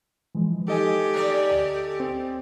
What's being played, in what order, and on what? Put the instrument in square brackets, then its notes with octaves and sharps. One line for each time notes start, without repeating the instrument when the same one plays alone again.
[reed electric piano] E3 F3 G#3
[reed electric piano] D#4 [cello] G4 [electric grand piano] A4 D#5 G#5
[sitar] A3 C#5 D5
[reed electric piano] D2
[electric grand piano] C4